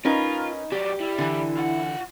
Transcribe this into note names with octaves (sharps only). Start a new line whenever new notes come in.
C#4 D#4 F4 A#4 B4
F#3 G3 G4 D5
G3 E4
D3 E3
F4 F#5